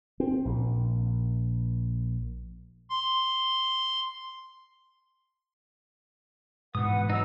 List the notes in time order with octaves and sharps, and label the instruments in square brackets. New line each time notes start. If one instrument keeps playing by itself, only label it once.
[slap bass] C4
A#1
[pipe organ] C6
[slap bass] G#2 B2 E3 [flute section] B4 F#5 [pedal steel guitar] D#6
[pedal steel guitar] F#3 D#4 [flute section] E6